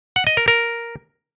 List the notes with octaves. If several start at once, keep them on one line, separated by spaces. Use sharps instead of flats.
F#5
D#5
A#4
A#4